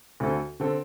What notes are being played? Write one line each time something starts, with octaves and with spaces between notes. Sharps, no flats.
D2 D3 C4 A4
D3 C4 A4